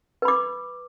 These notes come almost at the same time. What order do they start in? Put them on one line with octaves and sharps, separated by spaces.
B4 B5 D6